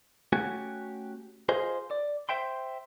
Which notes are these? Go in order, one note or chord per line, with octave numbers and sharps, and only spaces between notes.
A3 C#4 F#4 G4 F#5 G#5
F4 G#4 C5 D#5 F5
D5
C5 E5 G5 C6